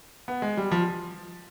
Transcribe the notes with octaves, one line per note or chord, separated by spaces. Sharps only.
B3
G#3
G3
F3